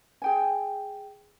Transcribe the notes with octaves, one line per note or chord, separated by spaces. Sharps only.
G#4 G5 G#5